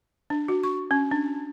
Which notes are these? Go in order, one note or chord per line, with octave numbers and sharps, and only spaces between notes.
D4
F#4
C#6
C#4
D4